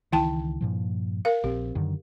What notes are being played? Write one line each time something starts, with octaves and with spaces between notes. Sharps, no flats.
C#2 D#3 E3 E4 G5 A5
G2 A#2 F3
A#4 F5
A#1 C4 G4
F#2 D3 D#3